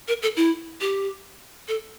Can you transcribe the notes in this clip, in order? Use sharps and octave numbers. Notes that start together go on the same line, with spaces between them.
A#4
A4
E4
G4
A4